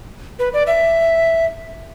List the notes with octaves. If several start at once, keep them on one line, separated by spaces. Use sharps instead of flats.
B4
D5
E5